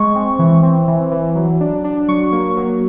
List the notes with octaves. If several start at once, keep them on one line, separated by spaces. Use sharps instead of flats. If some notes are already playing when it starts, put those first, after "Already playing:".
Already playing: G#3 C#6
C4
E3
C4
E3
E3
F#3
D4
D4
F#3 C#6
A#3
F#3